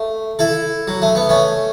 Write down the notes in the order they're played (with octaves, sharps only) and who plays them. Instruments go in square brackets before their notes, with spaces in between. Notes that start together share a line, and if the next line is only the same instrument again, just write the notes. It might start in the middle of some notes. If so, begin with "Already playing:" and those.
Already playing: [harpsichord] A3
E4 A4
F#3
A3
B3
A3 C#4